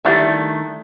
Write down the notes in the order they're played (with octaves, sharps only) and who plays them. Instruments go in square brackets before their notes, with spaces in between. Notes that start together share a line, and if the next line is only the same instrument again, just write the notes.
[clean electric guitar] D#3 A3 D4 [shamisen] G3 E4 E5